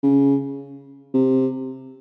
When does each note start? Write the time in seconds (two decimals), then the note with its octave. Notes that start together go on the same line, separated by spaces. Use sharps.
0.03 C#3
1.14 C3